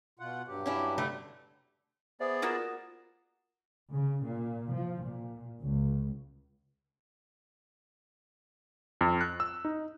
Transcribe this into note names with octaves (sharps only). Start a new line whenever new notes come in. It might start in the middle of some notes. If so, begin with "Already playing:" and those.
B2 F4 F#5
G2 F#3 G4
C#4 D4 E4
D3 G3 A3
B3 G#4 C5 D5 E5
A#3 F4 F#4 D#6 A#6 E7
C#3
A#2
F3
A#2
C#2
F2
F#6
E6
D#4